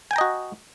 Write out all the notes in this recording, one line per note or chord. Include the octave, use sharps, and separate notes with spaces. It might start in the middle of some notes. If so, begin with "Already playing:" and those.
F#4 D#5 G5 G#5 A#5